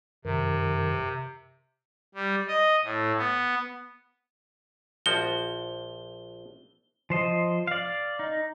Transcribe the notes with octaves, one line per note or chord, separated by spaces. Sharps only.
F#2 C3 D#3 A#4
G3
D#5
A2
B3
A#1 F3 F#4 G7
F3 C5 D#5
D5 F5
D#4